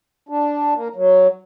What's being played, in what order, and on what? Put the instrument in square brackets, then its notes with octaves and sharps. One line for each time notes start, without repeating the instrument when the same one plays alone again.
[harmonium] D4
A#3
F#3